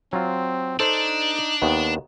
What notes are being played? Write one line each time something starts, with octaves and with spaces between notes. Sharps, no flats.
F#3 C4 F4
D4 D#4 A4 C5
D#2 D#3 B3